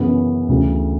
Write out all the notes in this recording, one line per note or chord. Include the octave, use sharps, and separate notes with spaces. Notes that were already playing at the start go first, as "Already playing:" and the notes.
Already playing: F#2 C#3 E3 B3
D2 C#3 E3